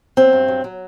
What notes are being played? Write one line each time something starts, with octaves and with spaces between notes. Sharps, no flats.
F#3 C4
G2
F#3
F#3